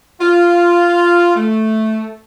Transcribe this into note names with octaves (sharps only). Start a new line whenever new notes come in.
F4
A3